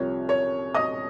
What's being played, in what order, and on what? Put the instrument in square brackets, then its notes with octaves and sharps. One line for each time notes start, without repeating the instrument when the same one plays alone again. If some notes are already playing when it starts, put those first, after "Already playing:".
Already playing: [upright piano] C2 C3 F3 C#5
C#5 C#6
D#5 D#6